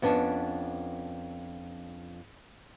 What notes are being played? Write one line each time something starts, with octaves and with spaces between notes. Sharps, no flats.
F2 B3 C#4 D4